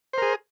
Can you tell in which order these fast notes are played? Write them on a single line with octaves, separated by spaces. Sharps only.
C5 A#4 G#4